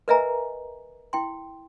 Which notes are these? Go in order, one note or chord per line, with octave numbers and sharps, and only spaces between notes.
A#4 B4 D#5 E5 G#5 A#5
E4 G5 C6